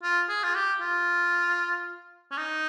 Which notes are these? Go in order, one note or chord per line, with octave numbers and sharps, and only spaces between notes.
F4
G#4
F4
G4
F4
C#4
D#4